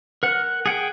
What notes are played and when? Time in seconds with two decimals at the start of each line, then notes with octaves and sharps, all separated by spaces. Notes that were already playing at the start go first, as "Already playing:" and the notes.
0.23 A#4 F#5
0.66 G#4 F#5 G5